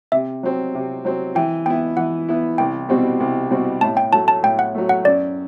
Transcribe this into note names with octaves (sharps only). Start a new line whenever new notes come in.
C3 E5
F#3 C4
C3
F#3 C4
E3 G5
B3 E4 G5
E3 F#5
B3 E4
C2 G5
B2 G3 C4 F#4
C2
B2 G3 C4 F#4
A2 A5
G5
F#3 A3 A5
A5
A2 G5
F#5
F#3 A3
F#5
F#2 D5